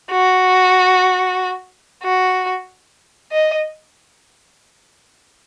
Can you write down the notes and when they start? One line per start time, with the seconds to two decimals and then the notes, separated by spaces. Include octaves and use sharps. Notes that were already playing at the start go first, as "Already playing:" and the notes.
0.11 F#4
2.04 F#4
3.32 D#5